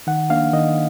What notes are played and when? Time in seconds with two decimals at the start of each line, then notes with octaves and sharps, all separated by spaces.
0.07 D#3 F#5
0.30 A#3 D4 F5
0.53 D#3 D#5